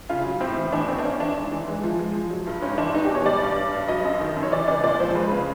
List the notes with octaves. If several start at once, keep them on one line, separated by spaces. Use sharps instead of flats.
C#3 F4
F#3
A2 C4
E3
E2 D4
E2 C4
D4
G2 C#4
E3 D4
G#2
E3
G#3
F3
G#3
F3
F#3
G2
G#2 C#4
E3 D4
E2 D#4
G4
B2
C#5
G3 D5
G2
G2
G2
F#3 D#5
F#2
D#3
F#2
C#5
E3 D5
C#2 D5
A#2 D5
F3 C5
G#3 B4
C#3